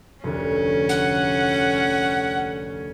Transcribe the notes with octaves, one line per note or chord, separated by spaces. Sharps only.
F1 D2 C#4
F#5